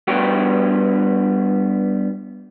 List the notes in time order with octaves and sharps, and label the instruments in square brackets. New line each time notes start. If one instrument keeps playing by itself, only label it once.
[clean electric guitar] G2 G3 B3 F#4 G5